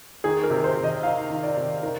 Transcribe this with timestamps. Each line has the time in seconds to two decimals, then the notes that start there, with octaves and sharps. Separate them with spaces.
0.24 D#3 G#4
0.43 A#4
0.50 C3
0.64 C5
0.77 C3
0.84 D#5
1.03 D#3 F5
1.30 D#3
1.43 D5
1.57 C3
1.83 D#3 A#4